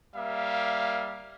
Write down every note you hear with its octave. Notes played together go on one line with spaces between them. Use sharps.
G3 A#3 E5 F5